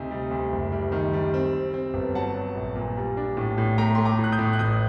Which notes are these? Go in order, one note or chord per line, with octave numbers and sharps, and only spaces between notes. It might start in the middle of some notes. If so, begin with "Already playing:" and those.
Already playing: D2 C3 D#4
G3
D2
F#1
G3
D#3
G3
C4
C4
C4
G1
F#3 F#5 A5
F#3
A#1
A#2
G3
D4
A2
A2
A3 G5 A#5
A3 C6
A#5 D6
A2
F#6
D#6 G6
A2
F#6
A1 D#6 G6